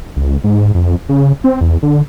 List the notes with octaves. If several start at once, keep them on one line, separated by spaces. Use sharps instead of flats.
C#2
G#2
F2
C#3
C4
E2
D3